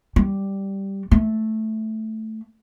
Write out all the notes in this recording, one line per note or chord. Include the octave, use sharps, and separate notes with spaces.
G3
A3